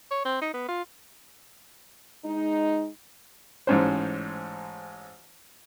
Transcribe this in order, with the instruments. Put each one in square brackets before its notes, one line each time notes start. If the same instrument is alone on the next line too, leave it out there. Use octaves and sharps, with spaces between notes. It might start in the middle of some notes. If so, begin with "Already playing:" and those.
[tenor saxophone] C#5
C4
D#4
B3
F4
[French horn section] G#3 D#4
[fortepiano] A1 G#2 C#4 C5